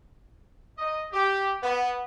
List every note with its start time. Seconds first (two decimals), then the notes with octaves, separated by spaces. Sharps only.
0.78 D#5
1.12 G4
1.63 B3